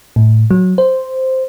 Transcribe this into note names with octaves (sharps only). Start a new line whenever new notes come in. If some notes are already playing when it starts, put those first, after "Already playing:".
A2
F#3
C5